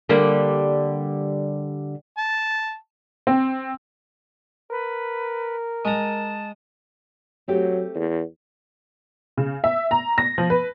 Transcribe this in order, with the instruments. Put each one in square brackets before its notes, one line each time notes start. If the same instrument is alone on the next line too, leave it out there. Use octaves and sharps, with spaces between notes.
[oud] D3 G3 A#3
[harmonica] A5
[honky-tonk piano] C4
[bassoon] A#4 [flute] B4
[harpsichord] G#3 A#5 [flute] A5
[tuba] F#3 [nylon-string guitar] A3 C4 G4
[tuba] E2
[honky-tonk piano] C#3
E5
A#5
A#6
F3
B4